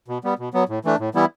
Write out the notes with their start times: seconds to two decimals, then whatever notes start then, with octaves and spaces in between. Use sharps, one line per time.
0.08 B2
0.24 G3 B3
0.39 B2
0.54 F#3 B3
0.69 A2
0.85 E3 A3 D4
0.99 A2
1.15 E3 G3 B3 E4